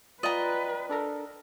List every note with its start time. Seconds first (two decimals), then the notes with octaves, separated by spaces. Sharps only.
0.23 F4 B4 D5 D#5 G5 A#5
0.89 D4 A4 A#4